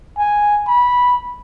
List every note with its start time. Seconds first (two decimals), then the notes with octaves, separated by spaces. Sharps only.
0.18 G#5
0.67 B5